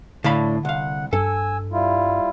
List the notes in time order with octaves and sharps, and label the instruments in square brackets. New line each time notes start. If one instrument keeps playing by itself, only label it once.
[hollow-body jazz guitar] A2 F5 B5 [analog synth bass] D3 [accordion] D4
[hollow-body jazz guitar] C2 F5 [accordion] F#5
[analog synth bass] G2 [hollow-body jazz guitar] A4 [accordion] G#5 E6
[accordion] G3 E4 F4